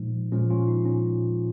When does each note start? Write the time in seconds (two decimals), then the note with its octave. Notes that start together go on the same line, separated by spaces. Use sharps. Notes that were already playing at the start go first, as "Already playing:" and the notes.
Already playing: A#2 F3 G#3 D#4
0.32 A#2 F3 G#3 C#4 F4
0.50 C#4 F4
0.68 D#4
0.85 C#4